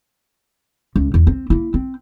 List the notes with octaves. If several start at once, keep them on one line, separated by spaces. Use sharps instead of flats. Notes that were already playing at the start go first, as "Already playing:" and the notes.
C#2
E2
C4
A#3 E4
C4